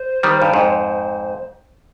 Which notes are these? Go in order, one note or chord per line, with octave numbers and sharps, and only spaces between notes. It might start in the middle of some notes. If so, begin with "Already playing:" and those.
Already playing: C5
D#3 G3
G2
F2 G#2